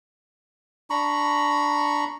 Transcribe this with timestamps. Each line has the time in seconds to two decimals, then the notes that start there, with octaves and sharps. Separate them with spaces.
0.90 D4 A#5 B5 C#6